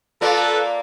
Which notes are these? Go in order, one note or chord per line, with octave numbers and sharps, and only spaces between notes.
A#3 F4 A4 B4 D5